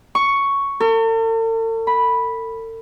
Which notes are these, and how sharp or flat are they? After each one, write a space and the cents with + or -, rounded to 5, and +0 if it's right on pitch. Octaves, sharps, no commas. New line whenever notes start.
C#6 +5
A4 +45
B5 -5